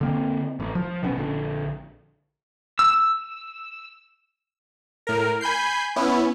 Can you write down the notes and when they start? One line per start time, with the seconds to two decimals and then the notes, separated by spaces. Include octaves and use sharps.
0.01 D3 A#3 C4
0.60 A1
0.75 F3
1.03 A#1 B2 B3 C#4
1.17 A#1 D3
2.79 E6
5.07 A2 A#4
5.41 G#5 B5 G6 C7
5.96 B3 C#4 E4